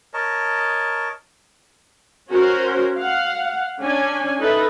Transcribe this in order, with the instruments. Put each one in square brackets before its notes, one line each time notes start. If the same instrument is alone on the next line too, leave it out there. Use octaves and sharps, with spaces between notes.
[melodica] A#4 C#5 D#5 A5
[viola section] C#4 F#4 A#4 C5
F5 F#5
C#4 D4 G#5
D#4 A4 B4 E5